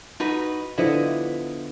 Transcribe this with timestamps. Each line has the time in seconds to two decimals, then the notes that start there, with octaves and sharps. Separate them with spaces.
0.20 D#4 F#4 B4
0.78 D3 F3 B3 E4 D#5 E5